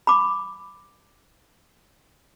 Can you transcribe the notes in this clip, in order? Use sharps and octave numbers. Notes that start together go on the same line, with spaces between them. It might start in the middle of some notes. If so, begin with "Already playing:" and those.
B5 D6